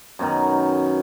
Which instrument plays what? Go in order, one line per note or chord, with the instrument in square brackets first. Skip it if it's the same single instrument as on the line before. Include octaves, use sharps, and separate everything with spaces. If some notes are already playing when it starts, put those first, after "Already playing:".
[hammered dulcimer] F#2 B2 D#3